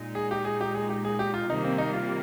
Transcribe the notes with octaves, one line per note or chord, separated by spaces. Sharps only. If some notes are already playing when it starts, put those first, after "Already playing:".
Already playing: A#2 G#3 D#4
G#4
G4
G#4
G4
G#4
G4
G#4
G4
F4
C3 D#3 G3 A#3 D#4
C4
D#4
F4